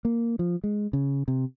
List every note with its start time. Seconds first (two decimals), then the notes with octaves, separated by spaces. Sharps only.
0.05 A#3
0.39 F3
0.64 G#3
0.93 C#3
1.28 C3